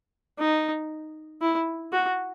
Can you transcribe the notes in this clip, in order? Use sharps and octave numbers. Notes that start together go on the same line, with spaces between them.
D#4
E4
F#4